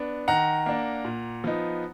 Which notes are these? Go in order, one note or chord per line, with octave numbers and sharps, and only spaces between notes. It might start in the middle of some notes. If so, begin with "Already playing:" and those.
Already playing: B3 D4
D#3 F#5 A#5
A#3 D4
A#2
F3 B3 D#4